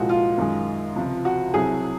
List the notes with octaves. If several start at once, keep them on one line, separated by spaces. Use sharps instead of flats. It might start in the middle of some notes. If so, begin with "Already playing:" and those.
Already playing: C2 A#2 F3 G#3 F#4
F4
F#2 D#3 G#3
C#2 C3 F3
F#4
C2 C3 F#3 G#4